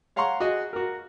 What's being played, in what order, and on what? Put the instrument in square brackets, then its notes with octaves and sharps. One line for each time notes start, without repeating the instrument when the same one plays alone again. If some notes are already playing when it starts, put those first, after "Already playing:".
[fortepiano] C#5 F5 F#5 A#5 C6 C#6
F#4 G#4 D#5
F#4 A#4